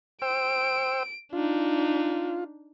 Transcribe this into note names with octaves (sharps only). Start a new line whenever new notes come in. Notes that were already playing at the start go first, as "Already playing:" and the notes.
C5 G5 E6 D7
D4 D#4 F4